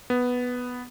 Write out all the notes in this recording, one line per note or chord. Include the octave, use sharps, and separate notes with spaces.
B3